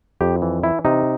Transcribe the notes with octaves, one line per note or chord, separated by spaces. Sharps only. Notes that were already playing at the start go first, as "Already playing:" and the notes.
F2 G4
E3
E3 E4
C3 D#4